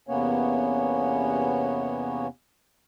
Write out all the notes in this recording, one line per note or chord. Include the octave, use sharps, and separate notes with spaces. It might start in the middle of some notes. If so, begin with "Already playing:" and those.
E2 C3 A#3 B3 C#4 C#5